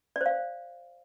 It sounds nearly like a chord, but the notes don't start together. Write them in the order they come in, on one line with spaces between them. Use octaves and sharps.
D5 C5 F5